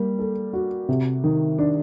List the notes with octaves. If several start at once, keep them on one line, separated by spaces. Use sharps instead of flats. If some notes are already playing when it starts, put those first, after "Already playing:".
Already playing: G3 A#3
A4
F#4
C3
D#3
D4